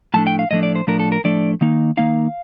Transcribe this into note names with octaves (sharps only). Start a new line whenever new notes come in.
A2 F3 A3 D4 A5
G5
F5
A2 F3 A3 D4 D#5
D5
C5
A2 F3 A3 D4 A#4
A4
A#4
A2 F3 A3 D4 D5
D#3 A#3 D#4
D#3 A#3 D#4 F5